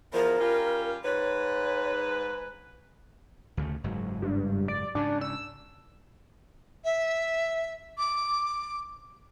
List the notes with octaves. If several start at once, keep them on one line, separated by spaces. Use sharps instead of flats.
E2 F3 A#4
G3 C#4 F4
G#2 B4 C#5
D2 C#3 A3
F#1 G#2 F#3
G2
D5
G#2 C#3 D4
E6
E5
D6